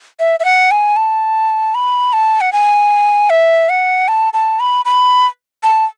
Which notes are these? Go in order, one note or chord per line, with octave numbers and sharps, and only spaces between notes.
E5
E5
F#5
G#5
A5
B5
A5
F#5
G#5
E5
F#5
A5
A5
B5
B5
A5